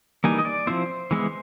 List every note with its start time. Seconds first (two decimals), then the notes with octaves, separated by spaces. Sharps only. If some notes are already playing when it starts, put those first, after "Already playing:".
0.24 E3 G3 A#3 D#4 G#5
0.39 D#5
0.45 D5
0.67 F3 A3 C4 E4 C5
1.11 E3 G#3 B3 E4